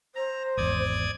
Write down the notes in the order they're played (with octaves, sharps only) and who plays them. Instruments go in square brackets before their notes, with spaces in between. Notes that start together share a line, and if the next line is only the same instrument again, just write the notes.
[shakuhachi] C5 [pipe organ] A#5
[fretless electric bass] G#1 E2 [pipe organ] D5 D#6 G#6